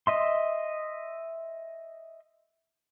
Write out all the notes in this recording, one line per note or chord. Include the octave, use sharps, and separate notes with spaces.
D#5 E5 C6